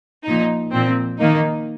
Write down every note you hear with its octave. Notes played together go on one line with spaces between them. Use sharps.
A#2 F3 D#4
A#2 F3 C4
D#3 A#3 D#4